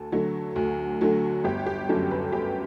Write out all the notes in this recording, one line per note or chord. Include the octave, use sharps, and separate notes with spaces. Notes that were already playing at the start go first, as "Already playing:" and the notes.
Already playing: D2 A4
D3 F#3 A3
D2
D3 F#3 A3
G1 G4
G4
F#2 D3 F#3 A3 A4
B4
G1 G4